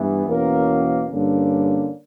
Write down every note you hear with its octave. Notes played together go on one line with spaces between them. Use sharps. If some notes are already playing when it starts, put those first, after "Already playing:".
Already playing: G2 E3 B3
E2 B2 A#3 C#4 A#4
G2 D3 A#3 C#4